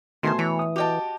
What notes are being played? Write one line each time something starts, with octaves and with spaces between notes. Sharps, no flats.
B2 D#3 A3 C5 G#5 C6
E3 C#5 B5
D#6
F#4 G4 D#5 G5 A5